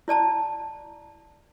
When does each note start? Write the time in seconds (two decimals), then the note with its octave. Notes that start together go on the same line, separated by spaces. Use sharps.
0.08 E4 D5 A5 A#5